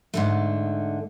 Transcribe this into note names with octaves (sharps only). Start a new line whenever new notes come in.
G#2 D3 A3